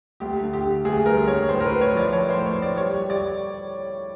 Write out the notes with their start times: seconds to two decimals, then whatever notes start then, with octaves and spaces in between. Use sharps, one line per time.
0.20 D2 G4
0.42 D3
0.53 G4
0.64 D3
0.85 D2 G#4
1.06 G3 A#4
1.27 D2 C#5
1.49 A2 C5
1.60 A#4
1.66 B4
1.71 A2
1.81 C#5
1.92 F3 D5
2.13 F3 C#5
2.30 C5
2.35 A2
2.46 C#5
2.56 A2
2.62 D5
2.77 G3 C#5
2.99 G3
3.10 D5